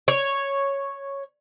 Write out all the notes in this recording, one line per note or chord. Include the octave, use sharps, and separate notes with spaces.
C#5